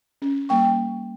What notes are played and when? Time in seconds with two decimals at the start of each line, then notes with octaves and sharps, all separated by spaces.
0.22 C#4
0.49 G3 A#3 G5 C#6